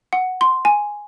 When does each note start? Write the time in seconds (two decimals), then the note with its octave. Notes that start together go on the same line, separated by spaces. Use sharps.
0.13 F#5
0.41 C6
0.65 G#5